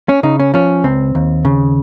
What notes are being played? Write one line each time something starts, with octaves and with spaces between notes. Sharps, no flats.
C#4
C#3 D#4
C#4
F3 C#4
C#2 C4
D#2
C#3